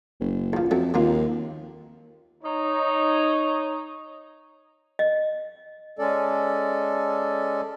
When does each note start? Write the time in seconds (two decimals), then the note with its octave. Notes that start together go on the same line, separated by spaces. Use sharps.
0.20 F#1
0.53 E2 F3
0.71 F2 E3 F#3 A3
0.94 D#2 F3 A#3 F4
2.43 D#4 C#5
4.99 D#5
5.99 G#3 C#4 A4 D5